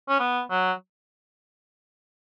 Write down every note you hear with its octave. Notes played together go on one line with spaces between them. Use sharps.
C#4
B3
F#3